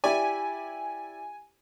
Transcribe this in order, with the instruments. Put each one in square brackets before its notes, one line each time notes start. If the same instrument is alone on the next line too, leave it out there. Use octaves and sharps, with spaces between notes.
[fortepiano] E4 G4 D5 [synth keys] G#5